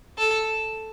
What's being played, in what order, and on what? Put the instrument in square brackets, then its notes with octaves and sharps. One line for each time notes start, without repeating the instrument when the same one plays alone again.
[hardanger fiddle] A4